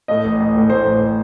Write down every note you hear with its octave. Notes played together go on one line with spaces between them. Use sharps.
A2 D#5
A1
A1
A2
A2 C5
A1